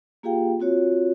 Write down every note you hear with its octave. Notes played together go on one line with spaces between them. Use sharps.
A#3 F4 G4 G#4 F5 G5
C4 F4 F#4 C#5